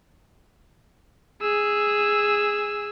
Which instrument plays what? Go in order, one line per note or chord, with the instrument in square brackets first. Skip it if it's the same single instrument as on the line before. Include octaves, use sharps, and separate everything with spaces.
[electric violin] G#4 E6